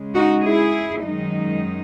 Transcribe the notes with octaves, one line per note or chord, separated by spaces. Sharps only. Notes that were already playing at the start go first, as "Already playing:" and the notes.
Already playing: C#3 G#3
D#4 F#4
E4 G#4
F#2 D#3 G#3 D#4